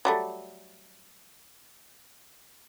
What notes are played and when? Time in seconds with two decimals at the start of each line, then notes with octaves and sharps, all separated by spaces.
0.05 F#3 G3 A3